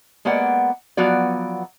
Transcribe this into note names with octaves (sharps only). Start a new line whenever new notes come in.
G#3 A#3 B3 D5 F#5
F3 F#3 B3 F#4 D5